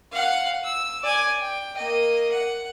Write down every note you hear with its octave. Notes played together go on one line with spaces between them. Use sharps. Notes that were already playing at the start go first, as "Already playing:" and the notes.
F5 F#5
E6
D5 G#5
G5
A#3 D#5
F#5